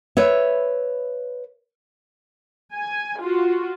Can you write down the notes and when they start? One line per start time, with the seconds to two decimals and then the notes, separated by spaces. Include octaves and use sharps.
0.17 B4 C#5 E5
2.73 G#5
3.20 F4 F#4